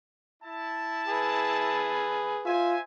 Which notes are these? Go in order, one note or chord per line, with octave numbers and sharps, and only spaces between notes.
E4 A5
G#4 B4
F4 C5 E5 G#5